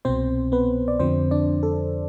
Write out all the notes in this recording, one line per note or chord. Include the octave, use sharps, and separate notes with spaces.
C2 B2 C4 C5
B3 B4
D5
F2 D3 F3 C4 C5
D4 D5
A4